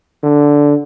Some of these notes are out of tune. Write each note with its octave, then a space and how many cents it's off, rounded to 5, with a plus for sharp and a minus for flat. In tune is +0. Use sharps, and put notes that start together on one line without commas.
D3 -10